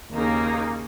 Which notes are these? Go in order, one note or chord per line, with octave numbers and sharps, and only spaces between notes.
D#2 C#3 A#3 D#4